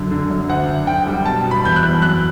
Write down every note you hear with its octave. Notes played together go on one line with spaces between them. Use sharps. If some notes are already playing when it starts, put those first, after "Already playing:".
Already playing: F#2 D3
D3
F#2
D2 F#5
D2
D3 G5
G3
B2 A5
B2
B5
E2 G6
F#6
E2
F#2 F#6